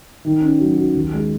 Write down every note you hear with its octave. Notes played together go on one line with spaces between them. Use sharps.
D#3
C#4
F#3
F#4
D#2
G#3